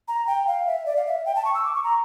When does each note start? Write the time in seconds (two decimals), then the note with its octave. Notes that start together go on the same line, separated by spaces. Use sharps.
0.08 A#5
0.27 G5
0.47 F5
0.67 E5
0.86 D5
0.96 F5
1.06 E5
1.26 G5
1.35 A5
1.45 C#6
1.54 E6
1.65 D6
1.75 C#6
1.84 A#5